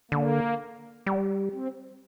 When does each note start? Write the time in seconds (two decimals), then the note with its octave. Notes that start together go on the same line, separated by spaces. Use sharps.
0.11 D3 A#3
1.07 G3
1.53 C4